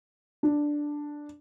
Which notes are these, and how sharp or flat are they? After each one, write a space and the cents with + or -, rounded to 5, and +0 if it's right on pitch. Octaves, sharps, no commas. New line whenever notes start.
D4 +0